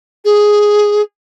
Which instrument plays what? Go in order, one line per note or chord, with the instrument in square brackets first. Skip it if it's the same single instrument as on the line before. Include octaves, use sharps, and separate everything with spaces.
[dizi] G#4